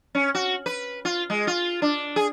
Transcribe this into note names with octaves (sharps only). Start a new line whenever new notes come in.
C#4
F#4
B4
F4
G#3
F4
D4
G#4